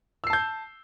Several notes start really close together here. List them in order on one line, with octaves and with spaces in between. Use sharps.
E6 C7 A5 G6